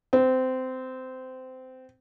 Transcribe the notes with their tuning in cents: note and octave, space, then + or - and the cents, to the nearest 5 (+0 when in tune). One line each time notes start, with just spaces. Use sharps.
C4 -20